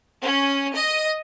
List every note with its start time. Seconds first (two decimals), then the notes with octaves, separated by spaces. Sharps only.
0.23 C#4
0.74 D#5